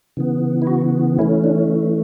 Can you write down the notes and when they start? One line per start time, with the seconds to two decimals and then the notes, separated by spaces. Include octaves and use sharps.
0.17 C#3 E3 B3
0.62 E4
0.67 F#4
1.19 E3 A3 C#4 E4
1.44 D4